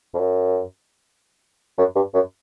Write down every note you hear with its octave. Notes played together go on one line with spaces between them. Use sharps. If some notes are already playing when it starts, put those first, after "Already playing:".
F2
F#2
F#2
G2
F#2